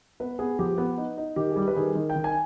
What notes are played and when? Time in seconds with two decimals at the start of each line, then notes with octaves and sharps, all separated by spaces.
0.20 B3 B4
0.39 B3 G#4
0.59 F3 G4
0.78 B3
0.97 D#4
1.17 D#4
1.36 D#3 G4
1.52 G#4
1.56 G3 G4
1.67 B4
1.76 D#3 G#4
1.95 D#3
2.09 G5
2.16 D#3
2.24 G#5